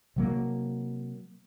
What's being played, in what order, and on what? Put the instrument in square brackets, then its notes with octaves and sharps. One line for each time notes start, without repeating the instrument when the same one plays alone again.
[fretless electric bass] C3 F#3 A#3